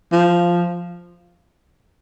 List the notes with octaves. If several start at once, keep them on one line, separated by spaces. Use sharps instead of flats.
F3